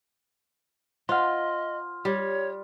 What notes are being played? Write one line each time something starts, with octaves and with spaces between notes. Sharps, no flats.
F4 C5 D#5 F#5 C6 F6
G3 C#5